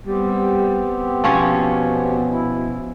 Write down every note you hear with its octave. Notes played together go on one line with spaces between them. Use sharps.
G3 B3 C4 G4
B2 F3 C#4 C#5
E4